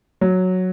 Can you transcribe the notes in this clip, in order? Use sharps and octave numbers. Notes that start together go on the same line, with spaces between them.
F#3